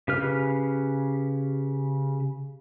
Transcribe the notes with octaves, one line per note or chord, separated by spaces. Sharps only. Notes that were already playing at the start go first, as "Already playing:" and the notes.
C#3 G4 B4 F6